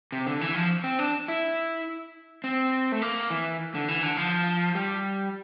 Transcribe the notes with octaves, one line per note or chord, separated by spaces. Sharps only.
C3
D3
E3
F3
C4
D4
E4
C4
A3
A#3
E3
D3
E3
D3
F3
G3